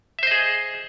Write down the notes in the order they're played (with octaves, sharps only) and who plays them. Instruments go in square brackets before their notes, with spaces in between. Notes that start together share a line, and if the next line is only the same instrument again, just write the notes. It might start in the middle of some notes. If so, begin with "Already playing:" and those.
[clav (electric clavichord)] E5
C5
D#5
G#4